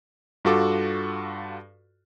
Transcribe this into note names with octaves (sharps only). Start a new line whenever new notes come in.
G2 F4 F#4 A4 D6